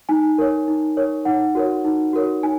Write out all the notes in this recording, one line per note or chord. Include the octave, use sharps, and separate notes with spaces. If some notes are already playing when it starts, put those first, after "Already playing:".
D#4 G#5
A#4 C#5
D#4
A#4 C#5
D#4 F#5
F#4 A#4 C#5
D#4
F#4 A#4 C#5
D#4 G#5